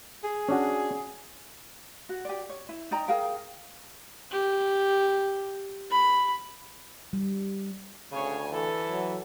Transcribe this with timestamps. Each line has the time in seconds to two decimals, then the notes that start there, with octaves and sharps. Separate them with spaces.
0.24 G#4
0.49 C#4 D4 F#4
2.09 F#4
2.25 G4 D5
2.50 C#5
2.69 E4
2.91 D#4 D5 G5 A#5
3.08 G#4 A#4 F5 G5
4.31 G4
5.90 B5
7.13 G3
8.12 D2 C#3 C#5 G#5
8.52 E3 A4
8.89 F#3